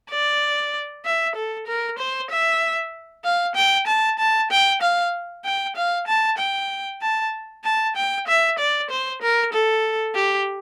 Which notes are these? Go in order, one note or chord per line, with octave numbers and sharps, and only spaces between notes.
D5
E5
A4
A#4
C5
E5
F5
G5
A5
A5
G5
F5
G5
F5
A5
G5
A5
A5
G5
E5
D5
C5
A#4
A4
G4